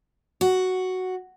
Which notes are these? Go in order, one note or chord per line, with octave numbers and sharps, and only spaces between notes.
F#4